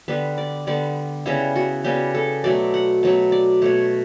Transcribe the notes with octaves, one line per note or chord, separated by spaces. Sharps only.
D3 G3 B3 B4
D5
D3 G3 B3 D5
C#3 G3 B3 E4
F#4
C#3 G3 B3 G4
A4
B2 F#3 A3 D5
F#5
B2 F#3 A3
D5
B2 A3 C#5